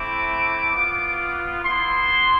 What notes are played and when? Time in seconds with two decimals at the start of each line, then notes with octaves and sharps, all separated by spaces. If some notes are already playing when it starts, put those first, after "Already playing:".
Already playing: A3 C4 E4 D6
0.71 B3 F4
1.64 B3 E4 C6